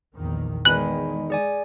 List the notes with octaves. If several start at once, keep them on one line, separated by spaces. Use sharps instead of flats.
A#1 E2 D#3
E2 D#3 G#3 G#5 B5 F#6
G#4 D5 G#5